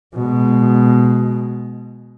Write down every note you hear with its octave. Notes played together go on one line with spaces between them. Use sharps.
B2 G#3